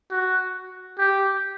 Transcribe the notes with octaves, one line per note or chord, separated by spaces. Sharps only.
F#4
G4